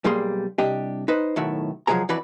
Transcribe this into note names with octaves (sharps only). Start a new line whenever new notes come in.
B1 G3 A#3 G#4 C6
C2 D4 G4 D#5
D#4 B4 C5
B1 A2 D#3 F#4 E5
C#2 F3 F#3 G#3 G#4 A#5
F2 E3 F#4 B4 D5 B5